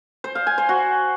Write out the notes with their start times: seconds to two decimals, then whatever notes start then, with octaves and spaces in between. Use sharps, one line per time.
0.24 C5
0.35 F5
0.47 G#5
0.58 C5
0.69 F#4